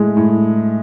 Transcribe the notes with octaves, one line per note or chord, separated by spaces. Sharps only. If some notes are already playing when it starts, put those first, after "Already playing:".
Already playing: A2 G#3
A2